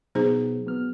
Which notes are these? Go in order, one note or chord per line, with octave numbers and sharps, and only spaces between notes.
B2 F#3 B3 D#4 G#4 C5
F#3 B3 F6